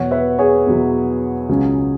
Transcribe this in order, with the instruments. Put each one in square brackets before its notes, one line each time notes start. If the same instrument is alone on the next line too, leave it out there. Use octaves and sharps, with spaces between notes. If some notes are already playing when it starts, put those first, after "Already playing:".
Already playing: [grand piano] E2 B2 F#3 C#5 F#5
B4 E5
G#4 C#5
E2 B2 F#3
C#2 C#3 F#3